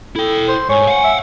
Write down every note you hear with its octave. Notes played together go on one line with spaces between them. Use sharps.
E4 A4 G5
C5
G#2 C#5 G#5
F5 F#5
E5